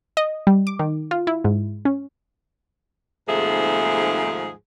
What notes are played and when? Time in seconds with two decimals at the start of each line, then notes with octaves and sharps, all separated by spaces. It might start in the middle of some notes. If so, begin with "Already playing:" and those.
0.17 D#5
0.47 G3
0.67 D6
0.79 D#3
1.11 F4
1.27 E4
1.44 G#2
1.85 C#4
3.28 D#2 G#2 C3 F3 A3 G#4